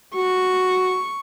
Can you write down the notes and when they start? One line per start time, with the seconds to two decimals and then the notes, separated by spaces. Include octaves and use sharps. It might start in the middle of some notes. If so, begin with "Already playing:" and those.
0.16 F#4 C#6